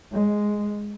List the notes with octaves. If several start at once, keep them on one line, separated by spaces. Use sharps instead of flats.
G#3